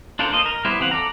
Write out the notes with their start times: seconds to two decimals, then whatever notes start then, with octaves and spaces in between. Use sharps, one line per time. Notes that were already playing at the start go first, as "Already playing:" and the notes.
0.19 D4 F4 A4 A#4 C5
0.32 A#3 C5 D#5
0.46 A#4
0.65 G3 B3 E4 C5
0.80 E3 C4 F5 F#5
0.91 A4 D5 A#5